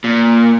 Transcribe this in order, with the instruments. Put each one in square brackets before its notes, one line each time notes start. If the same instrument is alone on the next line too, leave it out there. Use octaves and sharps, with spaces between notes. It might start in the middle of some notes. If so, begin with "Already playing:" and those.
[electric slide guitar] A#2